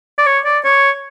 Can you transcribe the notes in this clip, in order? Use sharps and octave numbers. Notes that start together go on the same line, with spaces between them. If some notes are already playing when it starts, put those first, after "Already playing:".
D5
C#5
D5
C#5